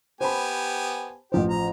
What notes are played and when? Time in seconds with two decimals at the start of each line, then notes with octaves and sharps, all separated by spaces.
0.21 B3 G4 C5 G#5 A5 B5
1.32 A1 F3 G4 C5
1.49 A#5